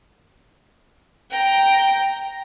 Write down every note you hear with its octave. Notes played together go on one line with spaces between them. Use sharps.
G5 A#5